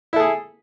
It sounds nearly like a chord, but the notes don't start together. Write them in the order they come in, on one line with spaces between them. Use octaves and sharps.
E4 A4 G#4